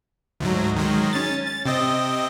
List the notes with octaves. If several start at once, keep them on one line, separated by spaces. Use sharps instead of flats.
D2 G#2 F#3
D#3 F#3 G#3
C#4 A6
A6
C3 C4 D#5